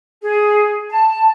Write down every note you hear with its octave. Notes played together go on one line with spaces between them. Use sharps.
G#4
A5